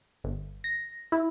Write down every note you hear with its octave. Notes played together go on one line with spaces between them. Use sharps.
G1
A#6
E4